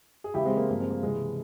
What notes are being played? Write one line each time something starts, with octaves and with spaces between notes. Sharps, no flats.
G#4
C#2 C#3 E3 E4 G4
G#3 C4
A#3
G2 F3 A#3
G#3 C4
A#3
C#2 C3 E3 G#3